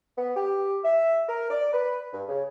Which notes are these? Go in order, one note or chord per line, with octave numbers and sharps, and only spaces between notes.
B3
G4
E5
A#4
D5
B4
G2
C#3